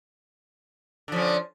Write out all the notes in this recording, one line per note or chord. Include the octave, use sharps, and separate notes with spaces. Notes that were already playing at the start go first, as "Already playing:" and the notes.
D3 F3 C#4